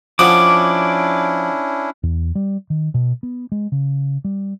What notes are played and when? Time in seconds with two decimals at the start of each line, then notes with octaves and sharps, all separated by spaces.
0.19 F3 C#4 D4 E4 F#5 D6 D#6
2.03 E2
2.35 G3
2.70 D#3
2.94 B2
3.23 B3
3.52 G#3
3.72 C#3
4.24 G3